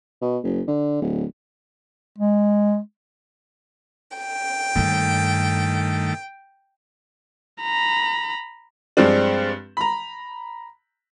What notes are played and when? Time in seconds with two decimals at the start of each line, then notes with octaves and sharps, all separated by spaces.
0.22 B2
0.44 F#1
0.67 D3
1.02 D1
2.18 G#3
4.18 G5
4.75 G2 D#3 A3 A#3
7.62 A#5 B5
8.97 G2 F3 G#3 C4 D4
9.77 A#5 B5